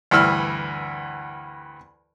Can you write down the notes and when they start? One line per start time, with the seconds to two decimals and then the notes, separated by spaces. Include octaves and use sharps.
0.11 D2 G2 E3 E6 F6